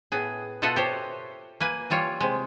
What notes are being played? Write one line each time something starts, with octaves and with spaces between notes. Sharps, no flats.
A2 B3 G#4
B2 F4 A4 D#5 E5 F#5
G4 C5 C#5
A#3 B4 G#5
E3 G3 F4 C#5
C3 G#3